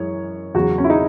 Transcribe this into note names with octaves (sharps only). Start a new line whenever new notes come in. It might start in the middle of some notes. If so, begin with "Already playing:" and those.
Already playing: F#2 E3 G#3 C#5
E2 C#3 F#3 F#4
C#4
E4
D#4